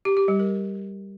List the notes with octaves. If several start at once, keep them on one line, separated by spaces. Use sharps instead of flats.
G4
G4
G3
A#4